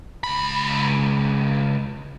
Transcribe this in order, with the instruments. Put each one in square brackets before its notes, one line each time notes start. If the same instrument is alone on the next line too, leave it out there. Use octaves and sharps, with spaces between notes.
[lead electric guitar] C#2 B5